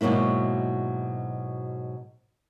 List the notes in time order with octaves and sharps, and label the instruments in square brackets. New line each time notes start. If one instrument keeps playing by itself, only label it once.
[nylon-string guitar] G#2 B2 F#3 A#3 E4